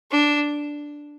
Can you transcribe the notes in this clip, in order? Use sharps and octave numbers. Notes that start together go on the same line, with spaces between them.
D4